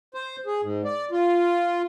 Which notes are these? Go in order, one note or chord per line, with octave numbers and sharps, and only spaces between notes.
C5
G#4
G#2
D5
F4